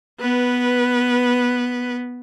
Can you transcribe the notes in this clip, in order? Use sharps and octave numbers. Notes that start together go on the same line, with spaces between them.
B3 B4